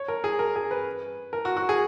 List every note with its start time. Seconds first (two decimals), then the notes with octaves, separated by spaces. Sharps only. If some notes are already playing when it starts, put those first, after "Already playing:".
Already playing: C#5
0.08 A#4
0.24 G#4
0.39 A#4
0.56 G#4
0.71 B4
1.33 A#4
1.45 F#4
1.57 F#4
1.69 G#4